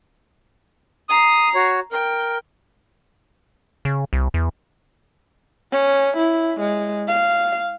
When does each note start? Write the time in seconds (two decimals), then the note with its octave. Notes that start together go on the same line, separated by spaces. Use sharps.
1.09 A#5 D#6 C7
1.55 F#4 C#5
1.92 A#4 G5
3.85 C#3
4.13 C2
4.34 E2
5.72 C#4
6.17 E4
6.60 G#3
7.08 F5